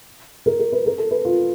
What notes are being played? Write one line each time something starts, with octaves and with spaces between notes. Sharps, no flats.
A#4
A#4
B4
A#4
A4
B4
F4